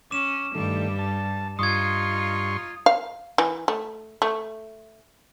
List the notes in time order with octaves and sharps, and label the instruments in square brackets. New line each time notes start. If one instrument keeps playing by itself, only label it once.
[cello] C#4 [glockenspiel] D6 E7
[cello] G2 G3 [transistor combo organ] D#3 A3
[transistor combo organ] A5
[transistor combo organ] G2 C6 C#6 [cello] D#4 F4 [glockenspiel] D#6 G#6
[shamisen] F5
E3
A3
A3